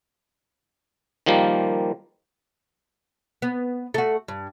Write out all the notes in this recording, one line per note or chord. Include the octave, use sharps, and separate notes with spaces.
D#3 F3 G3 A#3
B3
A3 F#4
G2